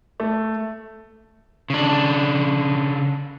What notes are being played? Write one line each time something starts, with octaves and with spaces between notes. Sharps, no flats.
A3
C#3 D4